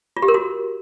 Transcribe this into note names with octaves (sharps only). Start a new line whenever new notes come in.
F4
G4
A#4
F#4